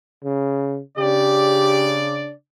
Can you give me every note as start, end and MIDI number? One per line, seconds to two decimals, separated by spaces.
0.24 0.80 49
0.98 2.32 49
0.98 2.32 62
0.98 2.01 67
0.98 2.32 74